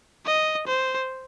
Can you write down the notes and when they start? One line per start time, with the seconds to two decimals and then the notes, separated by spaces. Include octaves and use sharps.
0.26 D#5
0.67 C5